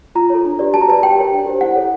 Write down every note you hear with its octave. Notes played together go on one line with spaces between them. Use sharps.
F4 A#5
A4 C#5
D4
G4 B4 D5
F#4 A5
A#5
B4 D5 A5
G4 G5
A#4 C#5
D4
G4 C5
E4 F#5
A4 C#5